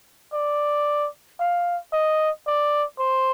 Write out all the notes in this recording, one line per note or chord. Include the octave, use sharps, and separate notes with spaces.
D5
F5
D#5
D5
C5